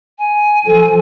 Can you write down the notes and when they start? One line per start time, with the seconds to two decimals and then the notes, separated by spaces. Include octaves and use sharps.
0.18 G#5
0.66 F3 A4